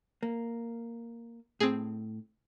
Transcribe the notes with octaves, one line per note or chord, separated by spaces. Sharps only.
A#3
A2 C4 G#4